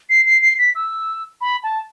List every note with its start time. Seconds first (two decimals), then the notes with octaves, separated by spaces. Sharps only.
0.10 C7
0.26 C7
0.42 C7
0.59 B6
0.75 E6
1.41 B5
1.63 A5